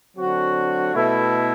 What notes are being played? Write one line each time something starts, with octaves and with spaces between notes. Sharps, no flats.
D3 F#3 C4 F#4
B2 A3 E4